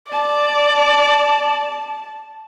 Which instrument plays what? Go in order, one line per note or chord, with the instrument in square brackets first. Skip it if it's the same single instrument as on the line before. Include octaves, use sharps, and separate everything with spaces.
[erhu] D5 [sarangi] A5